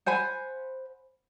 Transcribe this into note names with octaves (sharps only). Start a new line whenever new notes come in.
C5 F#5 G#5 B5